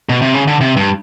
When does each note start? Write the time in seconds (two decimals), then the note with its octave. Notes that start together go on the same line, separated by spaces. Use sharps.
0.09 B2
0.22 C3
0.34 C#3
0.47 D3
0.61 C3
0.77 G2